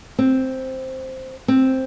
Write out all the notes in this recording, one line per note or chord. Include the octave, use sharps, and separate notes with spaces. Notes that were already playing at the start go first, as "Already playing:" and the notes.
C4
C4